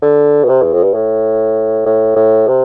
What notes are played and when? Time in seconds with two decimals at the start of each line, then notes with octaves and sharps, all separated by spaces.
0.02 D3
0.44 B2
0.49 C3
0.62 E2
0.73 F2
0.83 G2
0.94 A2
1.85 A2
2.16 A2
2.48 C3